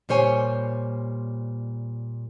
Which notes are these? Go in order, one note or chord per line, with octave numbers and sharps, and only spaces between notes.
A#2 G3 C5 C#5 G#5